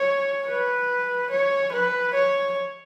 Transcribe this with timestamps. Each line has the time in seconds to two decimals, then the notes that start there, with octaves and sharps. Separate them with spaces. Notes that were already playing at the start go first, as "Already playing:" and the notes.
Already playing: C#5
0.47 B4
1.31 C#5
1.73 B4
2.14 C#5